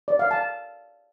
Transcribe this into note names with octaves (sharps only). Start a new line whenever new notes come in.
D5
F5
A5